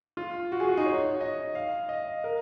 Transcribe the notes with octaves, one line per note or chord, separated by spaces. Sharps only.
F4
F#4
G#4
F#4
D#4
C#5
D#5
F5
D#5
A#4